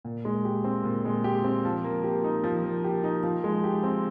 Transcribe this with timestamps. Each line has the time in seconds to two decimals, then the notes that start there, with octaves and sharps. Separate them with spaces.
0.05 A#2
0.25 G#3
0.45 G4
0.64 C4
0.84 A#2
1.05 G#3
1.24 G4
1.44 C4
1.65 F3
1.84 A#3
2.04 G4
2.24 D#4
2.44 F3
2.64 A#3
2.84 G4
3.04 D#4
3.23 F3
3.44 G#3
3.64 G4
3.83 C4